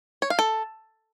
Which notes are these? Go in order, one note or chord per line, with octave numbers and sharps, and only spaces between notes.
C#5
F5
A4